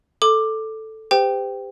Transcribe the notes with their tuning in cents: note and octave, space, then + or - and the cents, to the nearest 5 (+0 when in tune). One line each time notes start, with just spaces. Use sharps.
A4 +0 D6 +10
G4 +25 C5 -40 G5 +0